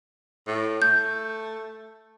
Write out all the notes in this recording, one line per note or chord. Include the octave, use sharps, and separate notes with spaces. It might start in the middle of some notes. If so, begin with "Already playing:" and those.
A2
A3 G6